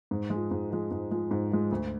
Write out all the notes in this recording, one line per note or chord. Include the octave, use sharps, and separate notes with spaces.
G#2
G#3
F3
G#2
F3 G#3
G#2
F3 G#3
G#2
F3 G#3
D2